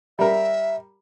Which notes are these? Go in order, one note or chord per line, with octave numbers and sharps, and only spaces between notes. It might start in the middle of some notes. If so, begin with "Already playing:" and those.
G3 A#4 E5